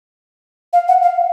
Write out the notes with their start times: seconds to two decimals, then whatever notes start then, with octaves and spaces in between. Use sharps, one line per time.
0.73 F5
0.88 F#5
1.02 F5